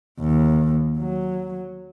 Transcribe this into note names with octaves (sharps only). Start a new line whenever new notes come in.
D#2
F#3